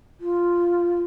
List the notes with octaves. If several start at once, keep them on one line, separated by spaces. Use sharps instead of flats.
F4